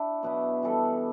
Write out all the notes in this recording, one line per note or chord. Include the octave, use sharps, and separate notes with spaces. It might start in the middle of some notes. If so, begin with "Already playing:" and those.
Already playing: D4 E4
B2 F#3 B3 E4
E3 G3 D4 A4